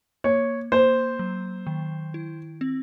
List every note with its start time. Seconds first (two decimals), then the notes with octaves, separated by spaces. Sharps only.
0.24 A#3 C#5
0.72 A#3 C5
1.19 F#3
1.67 D#3
2.14 E4
2.61 C4